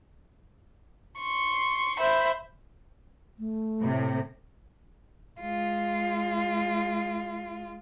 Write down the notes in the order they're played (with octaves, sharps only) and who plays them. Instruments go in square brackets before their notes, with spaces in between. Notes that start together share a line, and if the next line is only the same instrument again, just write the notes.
[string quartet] C6 C#6
C5 E5 B5
[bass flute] A3
[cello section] A2 C3
[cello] G#3 F4